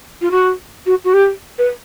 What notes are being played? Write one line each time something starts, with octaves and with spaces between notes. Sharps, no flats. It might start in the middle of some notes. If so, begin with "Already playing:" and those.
F4
F#4
F#4
F#4
G4
B4